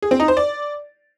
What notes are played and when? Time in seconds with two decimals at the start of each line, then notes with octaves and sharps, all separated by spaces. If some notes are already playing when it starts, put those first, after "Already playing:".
0.02 G#4
0.11 C4
0.20 D#4
0.28 C5
0.37 D5